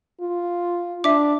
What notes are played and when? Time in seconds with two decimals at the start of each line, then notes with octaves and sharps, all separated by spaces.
0.21 F4
1.04 D4 E5 D6